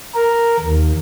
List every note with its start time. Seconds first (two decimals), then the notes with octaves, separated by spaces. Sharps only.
0.15 A#4
0.59 D#2